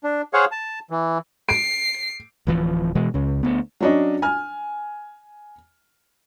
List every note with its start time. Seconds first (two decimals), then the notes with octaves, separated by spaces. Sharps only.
0.04 D4
0.34 G#4 C5 C#5 F5 F#5
0.52 A5
0.90 E3
1.49 C7 D7
2.47 D1 E3 F3
2.95 B2 E3 G#3
3.14 C#2 C#3
3.43 D2 B3
3.81 F#3 C#4 D4 C#5 D#5
4.22 G#5 F6